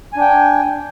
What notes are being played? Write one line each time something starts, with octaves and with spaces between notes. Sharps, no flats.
D4 G5 G#5